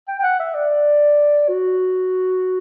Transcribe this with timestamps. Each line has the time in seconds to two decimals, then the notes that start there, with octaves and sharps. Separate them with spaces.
0.08 G5
0.20 G5
0.23 F#5
0.39 E5
0.54 D5
1.48 F#4